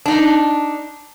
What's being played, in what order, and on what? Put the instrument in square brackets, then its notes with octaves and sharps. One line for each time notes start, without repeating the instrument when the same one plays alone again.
[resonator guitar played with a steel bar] D4 D#4